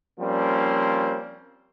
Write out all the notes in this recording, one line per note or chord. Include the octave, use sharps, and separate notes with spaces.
F3 G3 A#3 C4 C#4